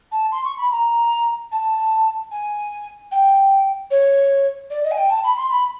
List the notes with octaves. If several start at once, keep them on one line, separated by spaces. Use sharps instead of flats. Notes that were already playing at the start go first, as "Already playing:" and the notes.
A5
C6
C#6
B5
A#5
A5
G#5
G5
C#5
D5
D#5
G#5
G5
A5
B5
C6
B5